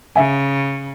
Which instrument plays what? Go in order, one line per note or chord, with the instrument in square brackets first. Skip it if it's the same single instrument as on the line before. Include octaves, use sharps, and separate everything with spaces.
[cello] C#3 [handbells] E5 F#5 G#5